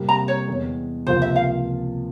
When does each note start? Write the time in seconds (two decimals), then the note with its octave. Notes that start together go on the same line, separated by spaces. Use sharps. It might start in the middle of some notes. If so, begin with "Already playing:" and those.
Already playing: C3 G3 A#3
0.09 A#5
0.28 C#5
0.47 E2 E3 G#3
1.07 C#2 C3 F3 A#3 F4 C5
1.22 E5
1.36 F5